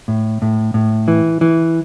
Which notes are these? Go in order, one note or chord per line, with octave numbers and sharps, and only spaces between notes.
A2
A2
A2
E3
E3